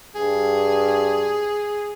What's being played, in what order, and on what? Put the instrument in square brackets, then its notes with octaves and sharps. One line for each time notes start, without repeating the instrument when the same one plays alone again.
[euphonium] G2 [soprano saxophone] G#4